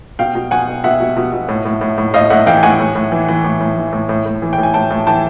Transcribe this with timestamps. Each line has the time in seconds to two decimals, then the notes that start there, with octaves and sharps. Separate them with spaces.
0.19 B2 F5 G5
0.35 B2
0.51 B2 F#5 G#5
0.68 B2
0.84 B2 E5 F#5
1.00 B2
1.17 B2
1.33 B2
1.48 A2
1.65 A2
1.81 A2
1.98 A2
2.14 A2 D#5 F5
2.30 A2 E5 F#5
2.46 E3 F5 G5
2.63 A2 F#5 G#5
2.79 A2
2.95 A2
3.12 E3
3.28 E3
3.44 A2
3.60 A2
3.77 E3
3.93 A2
4.09 A2
4.26 A2
4.42 E3
4.53 G5
4.58 A2
4.63 G#5
4.74 A2 G5 A5
4.90 A2
5.07 E3 G5 A5